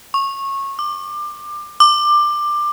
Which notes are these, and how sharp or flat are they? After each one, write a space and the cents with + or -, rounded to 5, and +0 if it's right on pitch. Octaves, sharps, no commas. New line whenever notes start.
C#6 -20
D6 +25
D6 +20